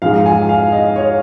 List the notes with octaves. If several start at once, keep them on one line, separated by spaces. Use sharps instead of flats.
G#2 F3 G#3 F5
G#5
F5
D#5
C#5